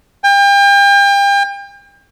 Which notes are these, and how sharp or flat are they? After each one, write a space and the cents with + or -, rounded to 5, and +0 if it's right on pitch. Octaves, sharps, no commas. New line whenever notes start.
G5 +35